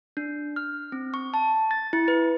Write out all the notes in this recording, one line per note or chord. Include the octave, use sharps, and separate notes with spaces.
D4
F6
C4
C#6
A5
A6
E4
B4